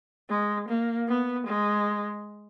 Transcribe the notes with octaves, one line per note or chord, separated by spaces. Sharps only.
G#3
A#3
B3
G#3